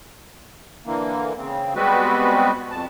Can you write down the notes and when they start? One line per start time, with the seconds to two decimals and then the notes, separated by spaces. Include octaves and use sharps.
0.86 D3 E3 A#3
1.38 C#3 C4
1.75 G3 G#3 B3 C4 F#4 B4
2.71 F2 A5